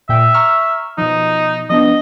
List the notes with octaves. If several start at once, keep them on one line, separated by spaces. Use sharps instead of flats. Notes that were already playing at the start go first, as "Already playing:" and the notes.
A#2 E5 G5
A#5 C#6 F6
B2 F3 D#4
F3 B3 D4 D#5